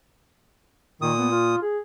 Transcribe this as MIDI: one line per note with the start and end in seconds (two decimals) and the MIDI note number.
1.02 1.56 46
1.02 1.12 51
1.02 1.56 87
1.19 1.27 59
1.31 1.60 65
1.62 1.78 68